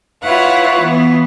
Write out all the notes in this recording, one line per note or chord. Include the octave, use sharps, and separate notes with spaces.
E4 F4 B4 C#5 F5 F#5
E3 B3